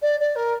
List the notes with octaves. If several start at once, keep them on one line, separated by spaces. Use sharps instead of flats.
D5
D5
A#4